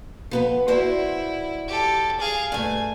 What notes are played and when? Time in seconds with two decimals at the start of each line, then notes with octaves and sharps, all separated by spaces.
0.31 F3 B3 B4
0.68 E4 F#4 C5 D5
1.67 G4 A4
2.20 G#4 F5
2.52 G2 A3 G#5